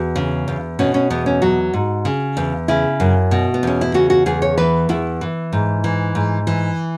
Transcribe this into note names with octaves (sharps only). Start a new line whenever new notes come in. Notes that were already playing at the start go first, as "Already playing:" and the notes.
Already playing: E2 F#4
C#3
E2
B2 C#4
C#4
E2 B3
C#4
F#3 F#4
G#2
C#3
E2
C#3 E4
F#2
B2
B3
E2 C#4
E4
C#3 F#4
F#4
E2 G#4
C#5
E3 B4
E2 E4
E3
G#2
E3
G#2
E3